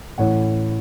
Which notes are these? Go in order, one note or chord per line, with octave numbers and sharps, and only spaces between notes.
A1 A2 E3 C#5 F#5